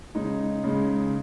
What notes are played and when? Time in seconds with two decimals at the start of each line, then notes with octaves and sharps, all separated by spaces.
0.15 C#3 G#3 D#4
0.64 C#3 G#3 D#4